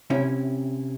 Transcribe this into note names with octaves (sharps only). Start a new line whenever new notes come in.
C3 C#4 E4